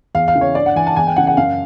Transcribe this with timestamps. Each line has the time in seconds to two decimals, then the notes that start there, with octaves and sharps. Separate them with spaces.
0.15 E2 F5
0.28 F5
0.35 C#3 E3
0.41 C#5
0.55 G2 D5
0.66 F#5
0.76 E3 G#5
0.87 A5
0.96 E2 G#5
1.07 G5
1.16 C#3 E3 F#5
1.27 F#5
1.37 F#2 F5